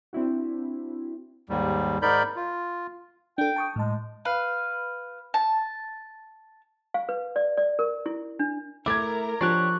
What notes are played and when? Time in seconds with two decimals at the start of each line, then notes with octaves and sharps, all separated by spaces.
0.13 C4 D4 E4 F#4
1.49 D#2 G#2 G3
2.02 G#2 D#4 A#4 D5 B5 G6
2.36 F4
3.38 D4 A4 G5
3.56 A5 C#6 D#6
3.76 A2 G#3 A5
4.25 B4 F5
5.34 A5
6.94 F5
7.09 B4
7.36 D5
7.57 D5
7.79 A#4
8.06 E4
8.39 D4
8.86 A3 E4 A#4 A#5 D6 G#6
9.41 F3 D4 G4 C#5 C#6 F#6